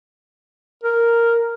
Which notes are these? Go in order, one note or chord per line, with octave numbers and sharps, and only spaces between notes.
A#4